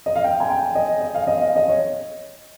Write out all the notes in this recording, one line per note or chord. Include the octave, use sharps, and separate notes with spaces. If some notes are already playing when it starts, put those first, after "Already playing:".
D#5
F5
G5
G#5
G5
D#5
D#5
F5
D#5
F5
D#5
C#5